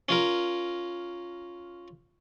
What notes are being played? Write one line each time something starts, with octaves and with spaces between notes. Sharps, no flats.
C#4 F4 A#4